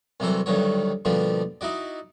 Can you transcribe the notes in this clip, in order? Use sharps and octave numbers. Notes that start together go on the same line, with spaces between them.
C2 C3 E3 F#3 A4 C5
D2 G2 D#3 F#3 C#5
B2 D3 F3 G3 A#3
D#4 E4 F#4 D5